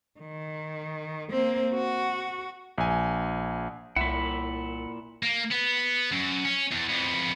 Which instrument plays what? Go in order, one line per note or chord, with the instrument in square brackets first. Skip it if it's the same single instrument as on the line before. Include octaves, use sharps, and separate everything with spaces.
[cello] D#3
A#3 C4
F#4
[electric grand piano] A#1 G#5
[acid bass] C2 [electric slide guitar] A#2 E4 [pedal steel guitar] F#5 B5
[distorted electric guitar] A#3
B3
F#2
C#4
E2
F2 B3